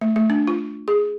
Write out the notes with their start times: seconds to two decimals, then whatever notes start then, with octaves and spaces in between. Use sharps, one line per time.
0.01 A3
0.16 A3
0.30 D4
0.47 F4
0.88 G#4